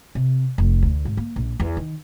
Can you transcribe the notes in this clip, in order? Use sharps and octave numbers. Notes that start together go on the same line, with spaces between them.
C3
F1
D2
G#1
A#3
A#1
E2
D#3